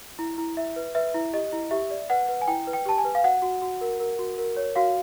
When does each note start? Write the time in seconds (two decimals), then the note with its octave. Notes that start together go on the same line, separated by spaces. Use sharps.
0.19 E4
0.38 E4
0.57 E4 E5
0.76 B4
0.95 B4 E5
1.14 E4
1.33 G4 D#5
1.53 E4
1.71 G4 E5
1.91 D5
2.10 B4 F#5
2.28 B4
2.42 G#5
2.48 E4 G5
2.67 B4
2.73 G5
2.86 G4 A5
2.98 G#5
3.05 B4
3.15 F5
3.23 F#4 F#5
3.42 F#4
3.62 F#4
3.81 A#4
4.00 A#4
4.19 F#4
4.38 A#4
4.57 C#5
4.76 F#4 F5